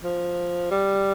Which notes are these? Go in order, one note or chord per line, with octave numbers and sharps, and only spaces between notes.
F3
G3